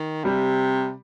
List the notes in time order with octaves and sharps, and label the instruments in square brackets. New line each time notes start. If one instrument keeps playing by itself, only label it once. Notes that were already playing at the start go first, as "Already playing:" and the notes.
Already playing: [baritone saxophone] D#3
[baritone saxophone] C3 [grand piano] G3